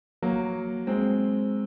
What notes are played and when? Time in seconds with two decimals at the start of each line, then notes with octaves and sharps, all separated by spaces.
0.22 F#3 A#3
0.87 G#3 C4